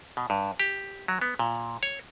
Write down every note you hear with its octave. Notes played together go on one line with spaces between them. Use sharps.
B2
G2
G4
F#3
B3
A#2
C#5